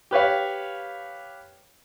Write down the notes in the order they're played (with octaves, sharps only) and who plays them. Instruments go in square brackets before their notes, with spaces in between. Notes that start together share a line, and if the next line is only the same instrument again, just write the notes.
[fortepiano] G4 B4 C#5 F5